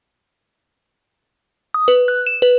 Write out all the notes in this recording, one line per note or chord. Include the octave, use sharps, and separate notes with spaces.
D#6
B4
F#6
E7
B4